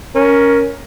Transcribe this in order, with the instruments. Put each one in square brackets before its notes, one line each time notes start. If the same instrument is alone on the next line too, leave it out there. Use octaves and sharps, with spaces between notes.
[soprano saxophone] C#4 [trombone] A#4